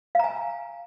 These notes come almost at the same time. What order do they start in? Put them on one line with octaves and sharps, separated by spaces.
F5 A#5 G#5